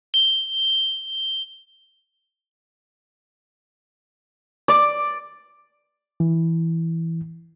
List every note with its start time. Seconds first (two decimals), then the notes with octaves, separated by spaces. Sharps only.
0.14 G7
4.68 D5
6.20 E3